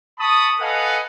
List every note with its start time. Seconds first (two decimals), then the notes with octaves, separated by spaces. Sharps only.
0.19 A5 B5 C#6 D#6
0.60 A4 B4 D#5 F5 F#5 G#5